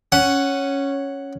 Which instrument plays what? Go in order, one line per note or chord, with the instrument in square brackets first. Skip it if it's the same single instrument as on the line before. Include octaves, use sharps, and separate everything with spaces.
[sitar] C#4 [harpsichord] F#5